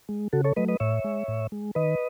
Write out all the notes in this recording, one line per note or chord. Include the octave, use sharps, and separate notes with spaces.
G#3
C#3 F#4 A4
A4 C#5
F#3 A3 B4 D#5
B4 D#5
A2 C#5 E5
G#3
A2
G#3
D#3 B4 D#5